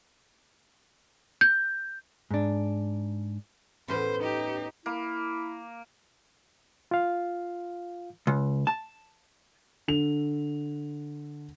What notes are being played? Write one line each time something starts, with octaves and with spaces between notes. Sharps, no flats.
G6
G#2 D4
E2 A2 A3 C#4 B4 C5
D#4 G4
A#3 E4
F4 F5
C#2
A5
D3 F7